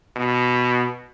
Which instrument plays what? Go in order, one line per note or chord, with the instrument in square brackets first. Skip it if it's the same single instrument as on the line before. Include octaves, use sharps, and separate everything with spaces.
[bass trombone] B2